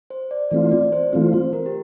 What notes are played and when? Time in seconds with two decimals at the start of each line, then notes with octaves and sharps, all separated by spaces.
0.10 C5
0.31 D5
0.51 E3 A3 C4 F4 D5
0.71 D5
0.92 C5
1.13 E3 A3 C4 F4
1.33 C5
1.53 A#4
1.66 G4